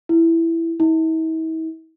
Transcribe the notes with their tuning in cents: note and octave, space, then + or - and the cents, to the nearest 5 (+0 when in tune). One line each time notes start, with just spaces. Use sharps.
E4 +5
E4 -45